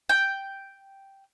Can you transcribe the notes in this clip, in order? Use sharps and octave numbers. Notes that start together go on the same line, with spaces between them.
G5